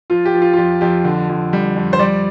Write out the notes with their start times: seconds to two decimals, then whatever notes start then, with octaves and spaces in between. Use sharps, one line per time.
0.10 F3 F4
0.25 G4
0.34 F3
0.42 F4
0.53 F4
0.57 F2 G4
0.81 F2 G4
1.04 D3
1.29 F2
1.53 G3
1.76 F2
1.93 C5
1.99 G3 D5